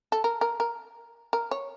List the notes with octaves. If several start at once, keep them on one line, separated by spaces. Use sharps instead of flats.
A4
A#4
A#4
A#4
A#4
C#5